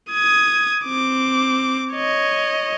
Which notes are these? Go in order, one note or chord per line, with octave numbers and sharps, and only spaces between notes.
D#6 G#6
C4 D6
C#5 D#5